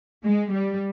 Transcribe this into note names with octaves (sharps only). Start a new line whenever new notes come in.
G#3
G3